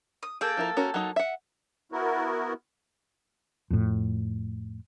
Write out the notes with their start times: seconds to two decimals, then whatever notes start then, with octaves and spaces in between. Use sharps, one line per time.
0.23 D#6
0.41 A#3 G#4 A4 G5
0.57 F3 E4 A#4
0.77 C#4 F#4 A#4
0.94 F#3 D#4
1.16 E5 F#5
1.92 B3 E4 F#4 A#4
3.70 F2 A2